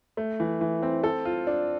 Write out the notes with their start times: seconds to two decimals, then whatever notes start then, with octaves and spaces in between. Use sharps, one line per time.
0.17 A3
0.40 E3
0.61 E3
0.83 C4
1.04 A4
1.25 F4
1.47 D4